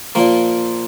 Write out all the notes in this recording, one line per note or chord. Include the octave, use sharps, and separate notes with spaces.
A#2 F3 A#3